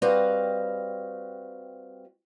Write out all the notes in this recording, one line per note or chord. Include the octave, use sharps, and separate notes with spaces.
G3 C4 F#4 B4 D#5 F5